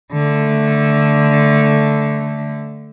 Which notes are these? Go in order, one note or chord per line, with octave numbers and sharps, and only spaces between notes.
D3 A3